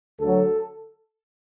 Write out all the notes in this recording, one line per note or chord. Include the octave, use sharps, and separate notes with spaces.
D2 D3 F#3 A4